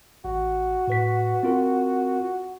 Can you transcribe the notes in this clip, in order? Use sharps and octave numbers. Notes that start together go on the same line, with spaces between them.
A1 F#4
A2 B4 B6
C4 F4 A#4